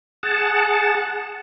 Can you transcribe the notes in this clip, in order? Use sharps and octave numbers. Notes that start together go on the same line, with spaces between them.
G#4 F#5 A5